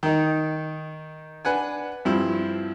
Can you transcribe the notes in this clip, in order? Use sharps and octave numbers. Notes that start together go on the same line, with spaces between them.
D#3 D#4
D4 B4 F#5 G#5
G2 F3 C4 E4